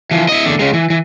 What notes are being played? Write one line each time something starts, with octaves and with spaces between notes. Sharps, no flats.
E3 F3
E4 D#5
E2 D3
C#3 G#3
E3
E3